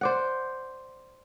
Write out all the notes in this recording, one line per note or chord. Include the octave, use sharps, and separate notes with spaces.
C5 D5 F#5